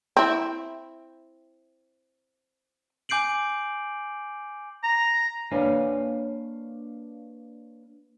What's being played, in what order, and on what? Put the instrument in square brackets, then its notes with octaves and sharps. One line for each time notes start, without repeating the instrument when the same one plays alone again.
[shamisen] C4 E4
[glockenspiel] G#5 D6 G6 C7 D7 F#7
[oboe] A#5
[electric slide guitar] A#3 D4 B4 C#5 F5 G#5